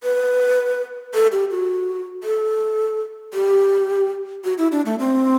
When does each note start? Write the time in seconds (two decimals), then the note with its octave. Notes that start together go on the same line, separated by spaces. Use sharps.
0.03 B4
1.14 A4
1.32 G4
1.51 F#4
2.24 A4
3.34 G4
4.44 F#4
4.58 E4
4.72 D4
4.86 A3
4.99 C4